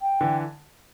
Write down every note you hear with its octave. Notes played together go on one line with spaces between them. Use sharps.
G5
D3 E3